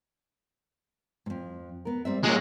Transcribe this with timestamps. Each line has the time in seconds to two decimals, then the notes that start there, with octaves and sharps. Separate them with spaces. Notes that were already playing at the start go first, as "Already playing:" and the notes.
1.26 F2 G#2
1.85 B3 A#4
2.05 G3 C4 E5
2.24 F#3 G#3 A#3 F4